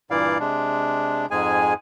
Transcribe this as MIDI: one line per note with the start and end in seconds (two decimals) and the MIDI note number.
0.11 0.38 43
0.11 0.38 46
0.11 0.38 52
0.11 0.38 64
0.11 0.38 74
0.11 0.38 77
0.40 1.26 48
0.40 1.26 56
0.40 1.26 62
1.31 1.74 41
1.31 1.74 44
1.31 1.74 56
1.31 1.74 68
1.31 1.74 80